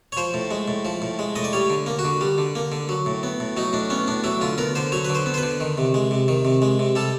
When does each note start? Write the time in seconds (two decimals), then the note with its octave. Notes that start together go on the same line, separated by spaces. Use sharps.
0.12 C#5
0.17 F3 C5
0.34 A2
0.51 G#3
0.68 A2
0.85 F3
1.02 A2
1.19 G#3
1.36 A2 D#5
1.44 D5
1.53 G3 C#5
1.70 D3
1.86 A#3
1.99 F#4
2.05 D3
2.21 G3
2.38 D3
2.55 A#3
2.72 D3
2.89 F#3
3.06 A2
3.23 B3
3.40 A2
3.57 F#3 D#4
3.73 A2 D4
3.90 B3 C#4
4.07 A2 D4
4.24 F#3 E4
4.41 D3 F4
4.58 B3 A#4
4.75 D3 C5
4.92 F#3 C#5
5.05 D3 B4
5.15 C5
5.26 B3
5.34 C5
5.38 B4
5.43 D3
5.60 D#3
5.78 C3
5.94 G#3
6.11 C3
6.28 D#3
6.45 C3
6.62 G#3
6.79 C3
6.95 G3 A4